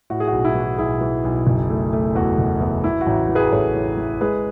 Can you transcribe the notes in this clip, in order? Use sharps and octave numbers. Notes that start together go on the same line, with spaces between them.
A2 F#4
G#4
B1 F#4
E4
E3
F#4
B1 E4 G#4
E3
B1
F#1
A3
A3
E2 F#4
F#1
E2
E3 E4
F#4
A1
E3
G#4 B4
A1 A4 C#5
E3
E3
G#3 G#4 B4